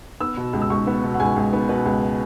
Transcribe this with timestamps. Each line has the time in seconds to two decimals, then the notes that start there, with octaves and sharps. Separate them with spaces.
0.21 B3 E6
0.37 B2
0.53 C#2
0.62 E6
0.70 C#2 C#6
0.87 B3
1.03 B2
1.14 F#5
1.20 C#2 G#5
1.36 C#2
1.53 B3
1.69 B2 B4
1.85 C#2